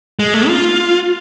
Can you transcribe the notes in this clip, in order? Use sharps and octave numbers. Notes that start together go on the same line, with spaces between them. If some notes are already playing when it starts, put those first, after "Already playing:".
G#3
A3
F4